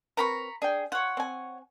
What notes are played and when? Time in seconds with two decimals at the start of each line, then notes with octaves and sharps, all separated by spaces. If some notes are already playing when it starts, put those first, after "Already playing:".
0.17 C4 A#4 B4 A#5 B5 C#6
0.62 D4 G#4 G5
0.92 F4 C#5 F#5
1.17 C4 G#5